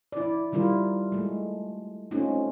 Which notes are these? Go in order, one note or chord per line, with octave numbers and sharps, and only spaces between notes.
E4 D5
D#3 G3 E4 F4 A#4
G#3 A3
A3 C4 C#4 D#4 F4